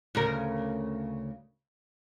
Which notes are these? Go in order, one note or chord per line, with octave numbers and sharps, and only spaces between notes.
D2 C#3 A#4